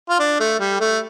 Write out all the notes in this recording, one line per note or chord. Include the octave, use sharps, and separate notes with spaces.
F4
D4
A3
G3
A3